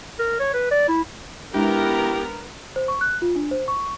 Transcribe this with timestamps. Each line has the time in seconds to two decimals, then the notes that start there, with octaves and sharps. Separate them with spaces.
0.19 A#4
0.40 C#5
0.54 B4
0.71 D5
0.88 E4
1.54 G#3 B3 D4 E4 G4 A#4 A#5
2.76 C5
2.88 C#6
3.01 F#6
3.22 F4
3.36 D4
3.51 C5
3.68 C#6